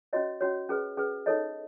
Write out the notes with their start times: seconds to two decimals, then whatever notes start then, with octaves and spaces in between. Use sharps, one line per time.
0.13 C#4 F#4 C#5 D#5
0.41 C#4 F#4 C#5
0.69 C#4 G#4 B4
0.97 C#4 G#4 B4
1.26 D#4 A4 C#5 D#5